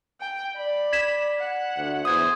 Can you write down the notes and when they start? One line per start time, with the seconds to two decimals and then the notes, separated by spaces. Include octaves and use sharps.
0.20 G5
0.56 D5 B5
0.92 G#6 B6 E7
1.39 F#5
1.77 D2
2.05 E2 C5 D#6 G#6